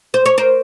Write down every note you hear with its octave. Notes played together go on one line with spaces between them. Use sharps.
C5
C#5
A#4 C5